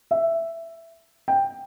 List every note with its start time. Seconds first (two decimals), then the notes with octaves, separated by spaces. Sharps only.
0.11 E5
1.28 G5